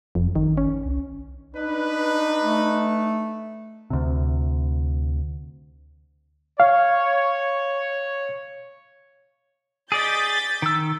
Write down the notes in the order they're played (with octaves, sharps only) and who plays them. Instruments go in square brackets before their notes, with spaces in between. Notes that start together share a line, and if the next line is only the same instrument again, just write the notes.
[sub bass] F1 [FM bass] F2
[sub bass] G#1 [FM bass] D#3
[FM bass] C#4
[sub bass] C2
[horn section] D4 D#4 B4
[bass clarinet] A3
[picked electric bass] D2 C3
[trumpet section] C#5 [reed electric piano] F5
[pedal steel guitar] G#4 D5 D#5 [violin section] G6 A6 B6
[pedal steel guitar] D#3 E6